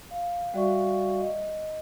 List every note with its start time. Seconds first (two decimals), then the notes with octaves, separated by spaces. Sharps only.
0.11 F5
0.54 G3 F#4 D5 E5 F5 C#6
1.20 D#5